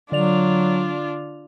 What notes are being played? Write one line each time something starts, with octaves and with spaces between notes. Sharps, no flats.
D3 F#3 D4 F4 D5 F7